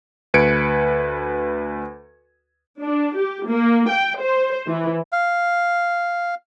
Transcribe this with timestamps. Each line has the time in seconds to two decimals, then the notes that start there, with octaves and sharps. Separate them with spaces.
0.34 D2 B4 G#6 C#7 D7
2.82 D4
3.18 G4
3.49 A#3
3.91 G5
4.22 C5
4.67 E3
5.12 F5